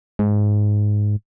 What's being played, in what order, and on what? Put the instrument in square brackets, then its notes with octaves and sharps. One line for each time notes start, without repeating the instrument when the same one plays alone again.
[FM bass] G#2